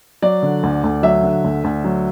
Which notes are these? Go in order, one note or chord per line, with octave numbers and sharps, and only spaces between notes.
F#3 D5
D3
D2
D2
F#3 E5
D3
D2
D2
F#3